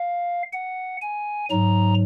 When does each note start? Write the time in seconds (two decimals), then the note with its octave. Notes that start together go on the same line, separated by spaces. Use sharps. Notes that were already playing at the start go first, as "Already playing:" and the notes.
Already playing: F5
0.53 F#5
1.01 G#5
1.50 G#2 F#3 A#5